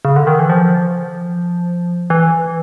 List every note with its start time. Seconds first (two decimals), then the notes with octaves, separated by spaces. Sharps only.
0.05 C#3
0.16 D3
0.27 D#3
0.39 E3
0.49 F3
2.10 E3